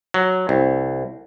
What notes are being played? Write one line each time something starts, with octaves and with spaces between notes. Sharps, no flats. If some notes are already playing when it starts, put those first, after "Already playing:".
F#3
C2